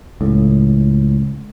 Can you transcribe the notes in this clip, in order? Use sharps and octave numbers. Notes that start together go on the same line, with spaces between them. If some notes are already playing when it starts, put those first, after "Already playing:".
C#2 A2